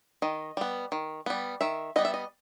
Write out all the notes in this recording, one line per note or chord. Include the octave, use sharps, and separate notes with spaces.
D#3 D#5
G3 B3
D#3
G3 B3
D#3 E5
G3 B3 D#5
E5
D#5